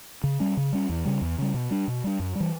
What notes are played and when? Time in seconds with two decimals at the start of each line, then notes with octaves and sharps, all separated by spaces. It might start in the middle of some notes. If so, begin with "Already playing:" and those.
0.24 C#3
0.40 G3 C#4
0.57 C#3
0.72 G3 C#4
0.89 E2
1.05 C#3 G3
1.22 E2
1.38 C#3 G3
1.54 B2
1.71 G3 D4
1.88 B2
2.04 G3 D4
2.19 F#2
2.35 E3 G3